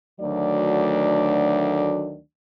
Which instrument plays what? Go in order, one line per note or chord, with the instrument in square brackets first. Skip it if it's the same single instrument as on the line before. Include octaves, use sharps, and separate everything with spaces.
[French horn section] D2 D#3 F#3 A3 D4 D5